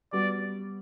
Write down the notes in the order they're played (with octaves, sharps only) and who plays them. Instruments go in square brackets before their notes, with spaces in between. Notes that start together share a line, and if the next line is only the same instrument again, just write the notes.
[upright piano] G3 B3 F#4 [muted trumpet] D5